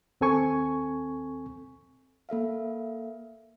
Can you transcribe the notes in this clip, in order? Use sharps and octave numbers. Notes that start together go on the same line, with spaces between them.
D#2 C4 A4 G#5 C#6
A#3 A4 E5 F5